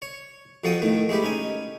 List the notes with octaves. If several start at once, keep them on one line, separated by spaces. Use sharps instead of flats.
C#5
F2 F3 F#4 A4 G5 D#6
A2 D#3 A3
G#3 A3 G4 B4
C#4 D#4 G#5